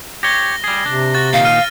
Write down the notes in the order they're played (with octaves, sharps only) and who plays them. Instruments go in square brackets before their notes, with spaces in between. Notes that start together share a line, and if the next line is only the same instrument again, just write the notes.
[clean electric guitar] G4 C#5 [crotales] A#6 G7
[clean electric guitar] G3 G#4
[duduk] C3 [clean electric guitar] D4
[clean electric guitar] F#4 [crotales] A6
[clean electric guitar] A#2 D#3 [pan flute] F5
[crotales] F6 D#7